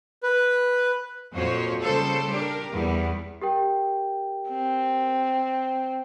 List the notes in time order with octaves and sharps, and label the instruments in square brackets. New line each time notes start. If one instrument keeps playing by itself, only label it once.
[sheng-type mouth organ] B4
[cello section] F2 A#2 F3 F#4 C5 C#5
C#3 G3 A4 C5
D4 G4 A#4
E2 G3 B3
[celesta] G4 A#4 G5
[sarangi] C4